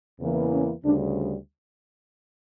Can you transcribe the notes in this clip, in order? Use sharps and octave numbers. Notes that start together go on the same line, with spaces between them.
E2 C#3 E3 A#3
C#4
D2 C#3 G3 D4